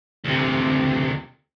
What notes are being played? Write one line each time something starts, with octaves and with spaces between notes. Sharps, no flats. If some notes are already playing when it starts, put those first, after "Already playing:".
D2 C3